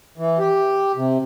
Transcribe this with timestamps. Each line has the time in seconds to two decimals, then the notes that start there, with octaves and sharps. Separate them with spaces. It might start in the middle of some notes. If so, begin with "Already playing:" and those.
0.18 E3
0.39 G4
0.96 C3